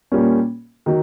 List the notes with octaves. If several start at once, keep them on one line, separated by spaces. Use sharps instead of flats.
A#2 G3 A#3 C#4
D#3 F#3